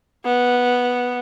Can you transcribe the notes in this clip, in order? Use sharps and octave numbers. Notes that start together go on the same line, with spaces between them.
B3